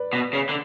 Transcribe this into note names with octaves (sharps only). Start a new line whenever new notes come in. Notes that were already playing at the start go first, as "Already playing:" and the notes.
Already playing: B4 D5
B2
C#3
D3